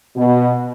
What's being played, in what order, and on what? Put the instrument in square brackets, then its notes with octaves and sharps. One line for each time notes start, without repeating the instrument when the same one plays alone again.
[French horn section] B2